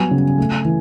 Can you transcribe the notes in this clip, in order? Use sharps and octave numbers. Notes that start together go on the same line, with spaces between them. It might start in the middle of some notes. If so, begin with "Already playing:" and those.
Already playing: F#3 G3 B3 G#5
C#3
A3
E3